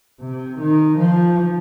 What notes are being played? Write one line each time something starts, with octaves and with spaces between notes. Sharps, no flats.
C3
D#3
F3